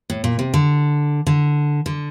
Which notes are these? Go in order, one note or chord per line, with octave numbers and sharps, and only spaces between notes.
A2
A#2
C3
D3
D3
D3